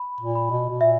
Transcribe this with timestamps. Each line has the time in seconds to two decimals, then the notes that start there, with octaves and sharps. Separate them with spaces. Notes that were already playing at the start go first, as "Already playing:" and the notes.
Already playing: B5
0.21 A#2
0.35 B5
0.51 B2
0.69 B2
0.81 A#2 E5